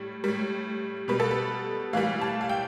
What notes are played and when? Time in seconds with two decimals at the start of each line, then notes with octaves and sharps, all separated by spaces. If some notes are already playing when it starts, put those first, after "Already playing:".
Already playing: A2 G3
0.24 A2 G3
1.08 B2 G3 B4
1.20 A4
1.31 B4
1.93 A2 E3 G3 F5
2.21 A5
2.41 F5
2.49 G5